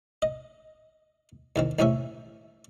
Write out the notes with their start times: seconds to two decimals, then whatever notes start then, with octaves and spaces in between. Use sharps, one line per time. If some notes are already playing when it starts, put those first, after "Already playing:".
0.22 D#5
1.56 E2 D#3 C4
1.79 B1 E2 A2 C3 C#4 E5